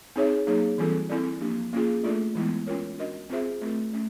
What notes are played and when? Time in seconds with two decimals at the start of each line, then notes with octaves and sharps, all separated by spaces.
0.16 C4 D#4 G#4 C#5 E5
0.47 F#3 A#3 D#4 G#4 C#5
0.78 E3 G3 C4 F4 A4
1.09 C4 E4 A4 D5
1.41 F3 A#3 D4 G4
1.73 A#3 C#4 F4 G#4
2.04 A3 D4 F4 A4 D5
2.35 E3 G#3 B3 E4
2.67 C#4 F4 A#4 C#5
2.98 D4 F#4 A#4 D#5
3.30 C4 F4 G#4 C5 E5
3.61 A3 C4 F4 A#4
3.93 A3 C#4